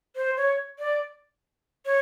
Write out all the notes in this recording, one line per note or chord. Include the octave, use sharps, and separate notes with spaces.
C5
C#5
D5
C#5